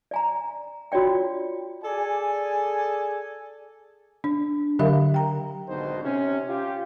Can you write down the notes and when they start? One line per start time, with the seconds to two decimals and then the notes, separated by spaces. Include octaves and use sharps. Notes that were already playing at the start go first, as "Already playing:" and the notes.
0.11 D5 G#5 A#5
0.92 F4 F#4 C#5 D5 G5
1.83 G#4 A4 D5 G#5
4.24 D4
4.79 D3 F#3 G4 A#4 E5 F5
5.14 G5 A#5
5.68 G#1 B2 D3 D#4 C5
6.03 C3 C#4
6.47 F4 G4